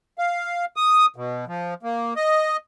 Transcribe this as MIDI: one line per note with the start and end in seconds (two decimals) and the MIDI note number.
0.18 0.65 77
0.76 1.06 87
1.16 1.45 47
1.47 1.74 53
1.83 2.14 58
2.16 2.57 75